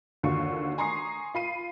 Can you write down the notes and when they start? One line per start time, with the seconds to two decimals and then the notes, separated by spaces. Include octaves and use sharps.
0.23 D#2 D3 F4 F#4 C#6
0.78 G#5 A#5 C6 C#6 D#6 C7
1.34 F4 B5 C7 D#7